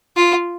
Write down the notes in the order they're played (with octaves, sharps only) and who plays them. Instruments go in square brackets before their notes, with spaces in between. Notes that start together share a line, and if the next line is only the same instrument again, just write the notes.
[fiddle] F4